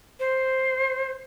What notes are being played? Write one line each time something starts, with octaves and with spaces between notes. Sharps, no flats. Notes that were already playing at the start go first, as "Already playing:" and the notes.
C5